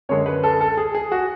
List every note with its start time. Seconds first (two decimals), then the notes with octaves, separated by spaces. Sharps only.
0.09 F#2 D3 G#3 C#5
0.26 B4
0.43 A4
0.61 A4
0.77 G#4
0.95 G#4
1.12 F#4